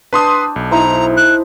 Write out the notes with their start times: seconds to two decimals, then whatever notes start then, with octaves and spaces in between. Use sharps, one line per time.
0.13 D4 B4 G5 A5 C6 D#6
0.56 B1
0.71 D#4 E4 C5 A#5
1.16 F#6